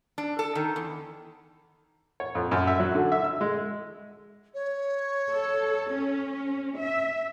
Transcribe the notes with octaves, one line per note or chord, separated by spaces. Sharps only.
D4
A4
D#3
E2
C#5
F2
F#2
E5
F#3
D3
E5
E6
G#3
C#5
A4
C#4
E5